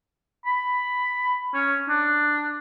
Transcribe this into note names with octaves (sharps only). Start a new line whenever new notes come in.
B5
C#4
D4